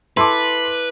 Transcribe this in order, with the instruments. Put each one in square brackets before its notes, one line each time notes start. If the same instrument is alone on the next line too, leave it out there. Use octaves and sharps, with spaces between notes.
[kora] E4 A4 [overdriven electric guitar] B4 [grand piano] C6 D6